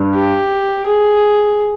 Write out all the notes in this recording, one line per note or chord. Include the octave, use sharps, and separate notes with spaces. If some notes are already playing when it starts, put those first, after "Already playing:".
Already playing: G2 G3
G4
G#4